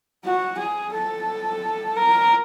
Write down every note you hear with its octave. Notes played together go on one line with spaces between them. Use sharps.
F#4
G#4
A4
A#4